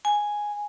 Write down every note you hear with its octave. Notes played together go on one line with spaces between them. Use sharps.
G#5